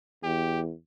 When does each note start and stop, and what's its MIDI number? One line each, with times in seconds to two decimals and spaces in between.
0.24 0.71 40
0.24 0.60 67